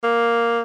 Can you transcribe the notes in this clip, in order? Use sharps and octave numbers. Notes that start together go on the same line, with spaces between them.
A#3